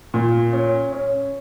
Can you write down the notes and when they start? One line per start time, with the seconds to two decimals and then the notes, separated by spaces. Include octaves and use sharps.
0.14 A#2
0.53 C#4
0.92 C#4